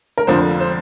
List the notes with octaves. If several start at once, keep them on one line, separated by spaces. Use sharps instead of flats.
A#4
F1 F2 D3 F3 C5
C5